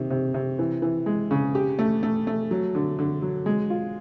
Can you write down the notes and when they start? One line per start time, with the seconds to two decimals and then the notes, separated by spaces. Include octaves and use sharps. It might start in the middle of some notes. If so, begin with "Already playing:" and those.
Already playing: C3 D#3
0.10 C3
0.34 C3
0.59 E3
0.82 E3
1.06 G#3
1.31 C#3
1.55 G4
1.79 A3
2.03 A3
2.27 A3
2.51 F#3
2.75 D3
2.99 D3
3.22 F#3
3.46 G#3
3.70 F4